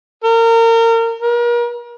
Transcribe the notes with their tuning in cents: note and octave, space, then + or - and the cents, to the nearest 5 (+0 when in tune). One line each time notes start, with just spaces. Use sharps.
A#4 -30
A#4 +40